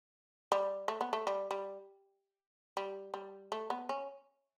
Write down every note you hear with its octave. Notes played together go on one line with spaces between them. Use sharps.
G3
A3
B3
A3
G3
G3
G3
G3
A3
B3
C#4